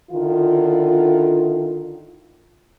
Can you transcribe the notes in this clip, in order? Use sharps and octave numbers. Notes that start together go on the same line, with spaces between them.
D3 D#3 E4 F4